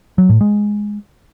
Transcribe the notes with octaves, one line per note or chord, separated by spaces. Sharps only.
F#3
A2
G#3